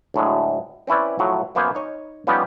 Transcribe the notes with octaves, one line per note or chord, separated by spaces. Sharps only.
D2 A2 F#3 G#3
C4 C#4 E4 B4 D5
A2 F3 F#3
F#2 A#3 B3 C5 F5 G#5
D#4 C#5 D#5
F3 G3 B3 C#4 D#4 G4